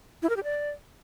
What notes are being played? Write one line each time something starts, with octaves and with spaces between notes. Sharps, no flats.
E4
A#4
G4
D5